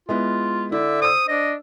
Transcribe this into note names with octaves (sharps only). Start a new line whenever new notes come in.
G#3 B3 E4 F4
D3 E4 E5
C5 D#6 E6
D4 D#5